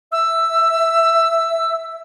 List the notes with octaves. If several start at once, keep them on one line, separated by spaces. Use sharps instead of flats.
E5 E6